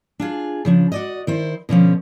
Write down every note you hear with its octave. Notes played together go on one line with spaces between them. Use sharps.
D4 F4 G#4
C#3 F3 D4
F#4 D5 D#5
D#3 E4 C5
B2 D3 F3 C#4